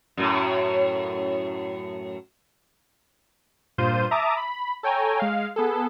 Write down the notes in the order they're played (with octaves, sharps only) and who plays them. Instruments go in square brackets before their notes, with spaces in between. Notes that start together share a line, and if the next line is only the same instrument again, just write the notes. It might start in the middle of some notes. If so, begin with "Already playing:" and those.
[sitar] F#2 A2
[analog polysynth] G2 A#2 F4 C5 G6 D#7
E5 A5 A#5 D6 D#6
B5
A4 C#5 G5 G#5 A#5
G#3 F5
B3 G#4 A4